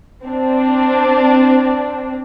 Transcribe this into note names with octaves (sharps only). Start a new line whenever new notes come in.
C4 D4